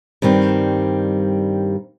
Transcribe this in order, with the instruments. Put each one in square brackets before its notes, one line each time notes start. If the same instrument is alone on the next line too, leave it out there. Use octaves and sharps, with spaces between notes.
[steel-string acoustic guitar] G2 D#3 G3 C4